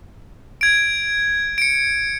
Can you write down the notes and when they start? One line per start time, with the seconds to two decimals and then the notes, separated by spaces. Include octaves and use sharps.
0.61 G#6 D7
1.58 C#7 D7